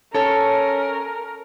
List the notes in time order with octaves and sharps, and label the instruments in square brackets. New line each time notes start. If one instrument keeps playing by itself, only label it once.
[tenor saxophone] C#4 [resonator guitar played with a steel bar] A4 C#5 [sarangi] A#4